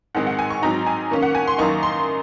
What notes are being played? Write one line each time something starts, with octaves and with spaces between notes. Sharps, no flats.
G#2 D#3 G#3 C4 F#5
F#5
G#5
C#6
G#2 F#3 C4 D#4 A#5
G#5
D#3 A#3 C#4
F#5
G#5
C6
F#2 D#3 A#3 D#4 C#6
C6